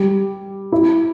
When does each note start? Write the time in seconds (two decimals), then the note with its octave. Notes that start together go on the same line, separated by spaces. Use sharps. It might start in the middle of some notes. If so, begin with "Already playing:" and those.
Already playing: G3
0.72 E4